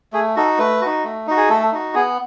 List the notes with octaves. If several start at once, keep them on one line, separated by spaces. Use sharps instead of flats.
A3 G#4
D#4 F#4 A4
A3 B4
D#4 F#4
A3
D#4 F#4
G#4
A3 A4
D#4 F#4
B3 G#4